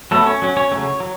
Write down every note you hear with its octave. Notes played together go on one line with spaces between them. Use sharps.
F#3 A3 B3 A4
C#4 C#5
F#3 C#4
C#4 C#5
C#3 F#3 A3 C#4
F#3